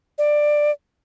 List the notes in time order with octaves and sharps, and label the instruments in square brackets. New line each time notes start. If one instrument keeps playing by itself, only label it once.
[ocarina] D5